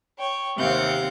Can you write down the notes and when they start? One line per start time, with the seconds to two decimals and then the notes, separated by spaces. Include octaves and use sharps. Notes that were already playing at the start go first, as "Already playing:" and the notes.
0.18 C#5 G5
0.58 D#2 C3 C4 F5 F#5 G6